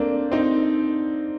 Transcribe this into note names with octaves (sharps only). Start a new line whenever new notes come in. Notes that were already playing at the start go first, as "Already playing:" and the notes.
Already playing: A3 A#3 C4 D4
C4 D#4